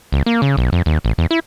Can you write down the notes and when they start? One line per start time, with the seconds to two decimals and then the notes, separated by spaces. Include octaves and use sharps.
0.13 C#2
0.26 A#3
0.42 C#3
0.57 B1
0.72 F2
0.86 D#2
1.05 A1
1.18 E2
1.31 E4